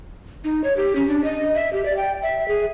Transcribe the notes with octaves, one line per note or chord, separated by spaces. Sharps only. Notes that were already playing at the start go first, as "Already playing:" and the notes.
D#4
C#5
G4
C#4
D4
D#5
E5
G4
D5
G5
E5
G#4